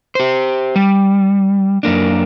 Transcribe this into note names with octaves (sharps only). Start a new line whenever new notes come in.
G4 C5
G3
F#2 A#3 D4